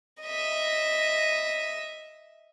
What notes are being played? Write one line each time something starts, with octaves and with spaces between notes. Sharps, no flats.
D#5 E5